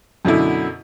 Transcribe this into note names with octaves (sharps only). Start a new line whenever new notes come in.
F#2 B2 D3 E4